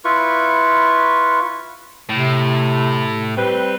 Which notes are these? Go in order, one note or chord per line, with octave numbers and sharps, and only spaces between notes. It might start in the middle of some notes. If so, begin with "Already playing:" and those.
E4 F4 B4 C#6
A2 C3
G3 C4 B4